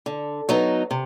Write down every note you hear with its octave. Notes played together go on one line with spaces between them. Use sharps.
D3
F#3 B3 D#4
C3